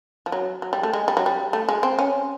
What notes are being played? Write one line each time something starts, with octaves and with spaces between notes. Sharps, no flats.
F3
F#3
F#3
G3
A3
G#3
G3
F#3
G3
A3
G#3
C4
C#4